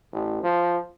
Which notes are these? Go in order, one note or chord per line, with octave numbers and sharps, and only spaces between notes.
A1
F3